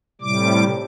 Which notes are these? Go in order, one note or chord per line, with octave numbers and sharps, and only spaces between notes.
A2 C3 G3 D6